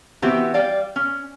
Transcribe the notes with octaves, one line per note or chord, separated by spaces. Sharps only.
E3 B3 C4 F#4 G4
G3 D5 F5 G5
C#4